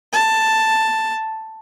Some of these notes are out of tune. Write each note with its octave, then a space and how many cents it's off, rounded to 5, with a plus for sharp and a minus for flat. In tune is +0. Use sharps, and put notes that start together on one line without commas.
A5 +5